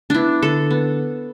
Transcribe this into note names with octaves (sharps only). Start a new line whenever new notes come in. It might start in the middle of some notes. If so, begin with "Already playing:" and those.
B3 D4 E4
D3 A4
B3